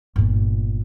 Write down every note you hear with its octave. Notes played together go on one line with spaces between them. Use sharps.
G1 A#2